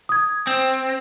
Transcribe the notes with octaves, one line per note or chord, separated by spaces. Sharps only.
D#6 G#6
C4